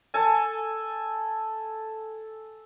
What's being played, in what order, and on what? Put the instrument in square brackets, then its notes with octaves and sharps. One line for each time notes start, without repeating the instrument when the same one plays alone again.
[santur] A4 G#5